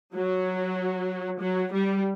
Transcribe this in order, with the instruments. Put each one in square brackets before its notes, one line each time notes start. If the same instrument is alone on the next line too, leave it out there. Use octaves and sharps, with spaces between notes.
[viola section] F#3
F#3
G3